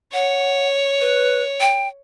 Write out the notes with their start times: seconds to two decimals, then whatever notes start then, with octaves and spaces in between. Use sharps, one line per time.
0.13 C#5 F#5
1.01 B4
1.61 G5